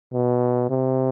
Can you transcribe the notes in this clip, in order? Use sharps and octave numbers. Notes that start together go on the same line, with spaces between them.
B2
C3